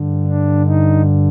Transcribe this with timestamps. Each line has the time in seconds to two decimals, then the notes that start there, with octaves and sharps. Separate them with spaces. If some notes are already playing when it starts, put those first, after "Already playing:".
Already playing: G2 D3
0.27 D4
0.66 D#4